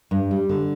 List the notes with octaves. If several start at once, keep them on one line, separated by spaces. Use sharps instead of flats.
G2
G3
D3